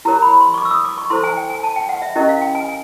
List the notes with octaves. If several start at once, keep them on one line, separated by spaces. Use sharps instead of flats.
E4 G4 A#4 C#5 A#5
B5
C6
C#6
D6
E6
D#6
D6
C#6
E4 A4 C5 C6
G#5
G5
G#5
A5
G5
F#5
E5
C#4 E4 G4 A#4 D#5
F5
G5
G#5
G#5